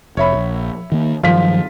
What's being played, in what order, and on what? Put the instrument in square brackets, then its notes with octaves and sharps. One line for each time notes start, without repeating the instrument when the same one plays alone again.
[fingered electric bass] F1 [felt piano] C#5 E5 B5
[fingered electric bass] A#1
D#3 A#3
[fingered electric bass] G2 D#3 F#3 [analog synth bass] F3 [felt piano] F4 B6